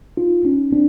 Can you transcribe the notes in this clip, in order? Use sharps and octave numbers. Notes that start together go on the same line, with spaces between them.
D#4 F4
C#4 D#4
C4 D4